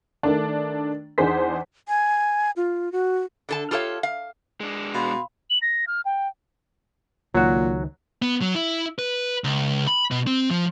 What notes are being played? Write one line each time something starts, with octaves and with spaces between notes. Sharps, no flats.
D#3 A3 D4
E2 D4 D#4 G#4 C5 B6
G#5
F4
F#4
D3 A4 A5
F4 G4 A4 C#5 F5
F5
G#3 D4
B2 F5 B5 C6
F#7
A#6
F6
G5
C#2 A#2 D#3 F#3 F#4
B3
F#3
E4
B4
C#2
B5
B2
C4
F3